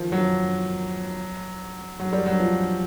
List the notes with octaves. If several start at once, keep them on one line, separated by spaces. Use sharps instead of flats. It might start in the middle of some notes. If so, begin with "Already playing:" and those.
Already playing: D#3 F3
F#3
F#3
G3
F#3
F3